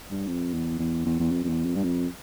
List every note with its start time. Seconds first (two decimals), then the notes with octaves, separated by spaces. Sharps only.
0.11 G2
0.27 F2
0.54 E2
0.79 E2
1.06 E2
1.20 E2
1.32 F2
1.44 F2
1.49 E2
1.66 F2
1.76 G2
1.84 F2